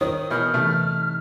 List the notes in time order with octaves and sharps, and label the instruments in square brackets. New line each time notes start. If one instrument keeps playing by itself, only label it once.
[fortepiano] D#3 [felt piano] C#5 [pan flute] D#6
[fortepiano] B2 E3 [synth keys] A#4 G6 [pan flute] F6
[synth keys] C3 E3 D#4 [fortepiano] A3